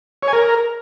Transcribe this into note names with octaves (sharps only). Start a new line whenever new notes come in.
C#5
G#5
A#4